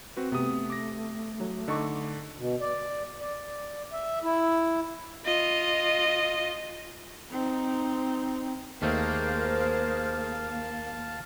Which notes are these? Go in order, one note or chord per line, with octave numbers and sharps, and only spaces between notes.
C4 F#4 B4
C3 A3 B3 D#6
D6 A#6
F#3
D3 D#4 A4 C#6 D6
B2
D5
D5
E5
E4
F4 D#5
C4 D#4
D#2 A3 A#3 G#4 A#4 C5 F5 A5